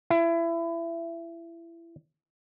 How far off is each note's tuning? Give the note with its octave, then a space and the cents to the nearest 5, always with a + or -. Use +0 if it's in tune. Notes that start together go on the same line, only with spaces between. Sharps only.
E4 +25